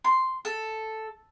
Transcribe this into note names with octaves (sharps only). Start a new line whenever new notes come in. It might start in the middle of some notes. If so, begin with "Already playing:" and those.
C6
A4